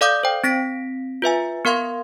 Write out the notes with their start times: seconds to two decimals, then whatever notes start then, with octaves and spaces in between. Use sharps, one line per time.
0.01 A4 D5 F5 D6 D#6 G6
0.23 C5 G5
0.44 C4 A#6 B6 D7
1.22 F4 B4 E5 G#5
1.65 B3 A#4 F5 C6 G#6